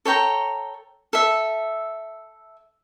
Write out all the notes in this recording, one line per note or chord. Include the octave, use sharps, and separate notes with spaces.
A4 C#5 G5 A#5
A4 E5